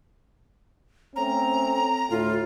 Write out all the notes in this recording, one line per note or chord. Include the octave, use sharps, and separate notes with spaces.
A3 C4 C#4 A#5
D2 A2 F4